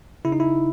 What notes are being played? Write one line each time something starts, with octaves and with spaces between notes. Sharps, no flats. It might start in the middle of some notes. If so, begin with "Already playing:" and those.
C#3 E4
D#4
E4